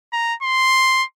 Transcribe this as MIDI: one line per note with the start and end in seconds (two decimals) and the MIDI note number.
0.13 0.34 82
0.43 1.04 84